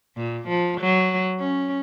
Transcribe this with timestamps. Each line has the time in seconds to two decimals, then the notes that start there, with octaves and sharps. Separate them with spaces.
0.16 A#2
0.48 F3
0.81 F#3
1.40 C#4